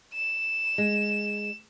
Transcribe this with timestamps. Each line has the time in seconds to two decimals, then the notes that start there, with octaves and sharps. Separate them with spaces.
0.14 E7
0.78 G#3